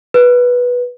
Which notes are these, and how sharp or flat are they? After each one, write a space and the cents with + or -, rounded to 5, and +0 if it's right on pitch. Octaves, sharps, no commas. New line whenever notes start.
B4 -10